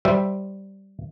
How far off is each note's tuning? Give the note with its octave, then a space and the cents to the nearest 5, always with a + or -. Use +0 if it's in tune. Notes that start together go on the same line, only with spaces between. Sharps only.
G3 -10 C5 +0 E5 +0